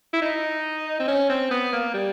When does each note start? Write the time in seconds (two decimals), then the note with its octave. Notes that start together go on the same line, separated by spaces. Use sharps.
0.13 E4
0.22 D#4
1.00 C4
1.08 C#4
1.30 C4
1.51 B3
1.73 A#3
1.94 G3